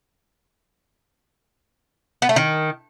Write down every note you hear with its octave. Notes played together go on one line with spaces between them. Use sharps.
B3
A3
D#3